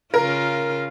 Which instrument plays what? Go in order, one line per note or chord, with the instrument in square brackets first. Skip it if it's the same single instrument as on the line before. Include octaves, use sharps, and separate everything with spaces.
[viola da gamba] C#3 F4 [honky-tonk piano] A#4